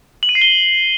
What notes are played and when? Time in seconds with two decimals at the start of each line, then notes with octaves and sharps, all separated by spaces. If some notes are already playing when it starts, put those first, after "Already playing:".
0.23 F#7
0.29 D#7
0.35 C7
0.42 G7